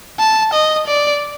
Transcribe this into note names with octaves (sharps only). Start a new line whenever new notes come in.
A5
D#5
D5